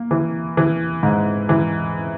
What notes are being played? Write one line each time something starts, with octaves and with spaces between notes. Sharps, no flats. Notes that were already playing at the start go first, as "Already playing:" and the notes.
Already playing: A#3
E3
E3
G#2
E3